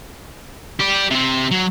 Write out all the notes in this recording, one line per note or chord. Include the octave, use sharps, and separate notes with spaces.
G4 D5
C3 C4
F#3